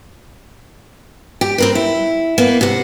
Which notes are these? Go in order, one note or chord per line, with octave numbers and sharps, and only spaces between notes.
G4
C4 A#4 B4
E4
A#3 B3
C3 F#5